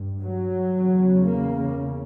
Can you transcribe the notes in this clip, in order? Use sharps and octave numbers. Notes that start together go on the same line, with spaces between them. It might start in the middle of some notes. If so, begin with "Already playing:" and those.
Already playing: G2
F#3
E2 C#3
A#3